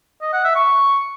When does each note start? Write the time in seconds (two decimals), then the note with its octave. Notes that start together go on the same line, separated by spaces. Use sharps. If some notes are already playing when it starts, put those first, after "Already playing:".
0.22 D#5
0.33 F#5
0.44 E5
0.55 C#6